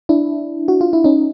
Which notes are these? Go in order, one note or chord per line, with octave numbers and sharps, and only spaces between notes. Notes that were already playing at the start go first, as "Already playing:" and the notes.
D4 E4
F#4
F4
E4
C#4 D#4